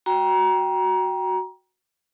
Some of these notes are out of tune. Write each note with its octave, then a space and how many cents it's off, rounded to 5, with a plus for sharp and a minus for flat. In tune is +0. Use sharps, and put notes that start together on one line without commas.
F#4 +0 G5 +0 A#5 +25